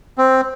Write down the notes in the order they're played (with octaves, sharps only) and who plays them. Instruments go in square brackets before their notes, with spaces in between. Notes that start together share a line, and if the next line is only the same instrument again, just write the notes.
[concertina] C4